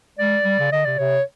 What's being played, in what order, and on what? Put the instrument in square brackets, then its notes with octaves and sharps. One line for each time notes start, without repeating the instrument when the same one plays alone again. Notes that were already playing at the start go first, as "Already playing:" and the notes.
[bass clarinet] G#3 [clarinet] D5
[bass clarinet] G3
C#3
[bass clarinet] D3 [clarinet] D#5
[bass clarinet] C3 [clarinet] D5
[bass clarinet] C3 [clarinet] C#5